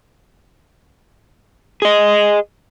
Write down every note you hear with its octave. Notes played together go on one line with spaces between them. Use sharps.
G#4 D#5